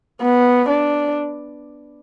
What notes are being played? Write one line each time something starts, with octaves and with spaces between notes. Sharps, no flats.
B3
D4